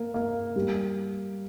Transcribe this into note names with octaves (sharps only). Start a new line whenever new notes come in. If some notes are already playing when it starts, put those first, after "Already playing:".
Already playing: A#3
A#3
G3